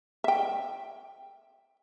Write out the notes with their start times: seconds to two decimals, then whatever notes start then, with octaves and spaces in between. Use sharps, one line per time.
0.24 E5 G5